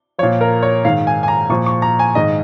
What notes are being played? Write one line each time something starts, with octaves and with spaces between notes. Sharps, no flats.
A#2 F3 C#5
A#4
C#5
G#2 D#3 F5
G#5
G#5
A#5
A#2 F3 C#6
C#6
A#5
G#5
G#2 D#3 D#5